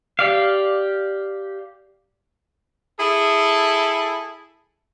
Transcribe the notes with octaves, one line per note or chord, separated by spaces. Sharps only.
G4 D5 F5
E4 G#4 A4